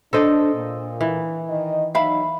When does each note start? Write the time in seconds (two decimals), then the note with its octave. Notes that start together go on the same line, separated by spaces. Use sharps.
0.13 D4 A4 A#4 C5 D5 D#5
0.53 A#2
1.01 E3
1.49 D#3 D#5
1.95 F#3 D#4 E5 F5 B5